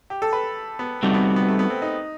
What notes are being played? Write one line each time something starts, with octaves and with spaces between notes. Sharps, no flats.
G4
A4
B4
B3
G3 A3 C4 D#4 F#4
B3
B3
A3
B3
C4
D#4